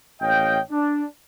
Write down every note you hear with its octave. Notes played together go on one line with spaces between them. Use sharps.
A1 C#5 D#5 F5 G5
D4